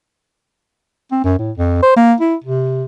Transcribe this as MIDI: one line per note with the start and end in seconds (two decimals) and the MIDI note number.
1.12 1.20 60
1.24 1.39 42
1.39 1.51 45
1.58 1.79 41
1.83 1.96 72
1.96 2.14 58
2.21 2.35 64
2.44 2.84 48